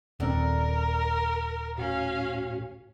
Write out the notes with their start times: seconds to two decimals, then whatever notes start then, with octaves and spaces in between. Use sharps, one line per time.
0.20 D#1 C4 A4 A#4 D5 F#5
1.78 A2 C#4 F#4 F5